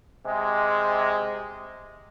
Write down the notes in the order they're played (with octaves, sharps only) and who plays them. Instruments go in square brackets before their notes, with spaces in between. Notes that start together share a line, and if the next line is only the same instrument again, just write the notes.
[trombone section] C3 G#3